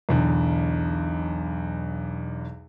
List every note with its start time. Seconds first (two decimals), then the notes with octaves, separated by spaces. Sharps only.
0.09 B1 E2 D3